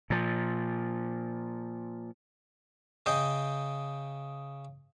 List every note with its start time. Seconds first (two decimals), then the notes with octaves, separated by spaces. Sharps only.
0.10 A#2 F3
3.06 C#3 D#5 G5